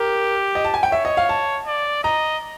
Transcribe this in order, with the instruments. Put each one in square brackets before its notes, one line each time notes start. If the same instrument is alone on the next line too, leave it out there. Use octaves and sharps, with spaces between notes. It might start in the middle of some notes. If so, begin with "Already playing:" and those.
Already playing: [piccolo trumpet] G4 [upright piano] A#4
[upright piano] D#5
A5
G#5
G5
[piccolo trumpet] C#5 [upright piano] E5
[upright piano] D#5
F5
A5
[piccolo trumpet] D5
[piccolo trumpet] D#5 [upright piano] A#5